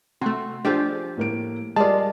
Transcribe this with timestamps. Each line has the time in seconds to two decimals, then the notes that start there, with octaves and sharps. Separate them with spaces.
0.21 C3 A3 F#4 C6
0.65 F3 A3 D4 F4 G4 G#4
1.17 A2 A#3 D7
1.76 G3 G#3 F4 G4 A#4 D5 A5